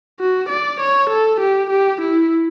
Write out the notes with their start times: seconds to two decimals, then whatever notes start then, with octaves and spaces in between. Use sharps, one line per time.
0.20 F#4
0.49 D5
0.80 C#5
1.10 A4
1.40 G4
1.70 G4
2.01 E4